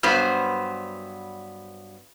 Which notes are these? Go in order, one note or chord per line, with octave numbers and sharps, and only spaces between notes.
G2 F#3 B3 C5